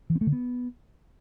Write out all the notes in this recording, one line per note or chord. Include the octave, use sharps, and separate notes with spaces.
E3
C4
A3
D3
B3